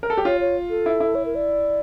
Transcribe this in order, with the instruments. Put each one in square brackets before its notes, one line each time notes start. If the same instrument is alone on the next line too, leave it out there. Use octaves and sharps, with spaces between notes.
[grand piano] A#4
A4
G4
[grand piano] F4 [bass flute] C#5
[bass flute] C#5
A4
[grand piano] E4
E4
[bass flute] C#5
A#4
D5